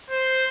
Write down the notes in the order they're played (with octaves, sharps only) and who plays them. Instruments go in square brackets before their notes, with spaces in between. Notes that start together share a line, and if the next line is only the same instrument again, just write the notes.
[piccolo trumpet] C5